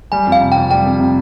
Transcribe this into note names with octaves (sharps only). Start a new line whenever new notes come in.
G3 G#5
F2
F5
C3
F2 G5
G3 G5
F2
C3